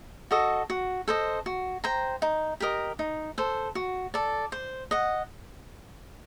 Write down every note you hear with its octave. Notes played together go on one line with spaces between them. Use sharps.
F#4 A4 D#5
F#4
A4 C5 D#5
F#4
C5 G5 A#5
D#4
G4 A#4 D#5
D#4
A4 C5
F#4
A4 D5
C5
D#5 F#5